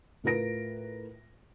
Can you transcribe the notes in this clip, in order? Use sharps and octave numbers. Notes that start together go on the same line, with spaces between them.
A2 F4 A#4 B4 A#6 D7